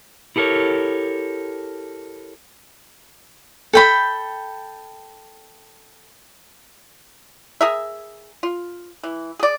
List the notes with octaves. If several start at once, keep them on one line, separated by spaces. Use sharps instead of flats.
E4 G4 A4 A#4 C#5
A4 G5 B5
G#4 A#4 E5
F4
E3
G#4 D5